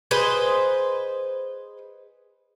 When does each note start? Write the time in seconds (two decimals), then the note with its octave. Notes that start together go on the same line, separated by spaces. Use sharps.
0.11 G#4 B4 C5 D#5